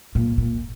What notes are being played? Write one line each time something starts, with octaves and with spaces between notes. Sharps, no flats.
A#2
A#2